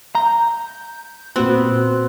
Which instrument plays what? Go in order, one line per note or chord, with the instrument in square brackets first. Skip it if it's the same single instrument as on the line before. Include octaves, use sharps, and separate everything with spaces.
[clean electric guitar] A#5 [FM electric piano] G6
[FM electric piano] A#2 F#4 F#6 [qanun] B3 C4